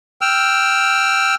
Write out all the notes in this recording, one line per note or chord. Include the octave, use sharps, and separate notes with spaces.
G5 E6 F6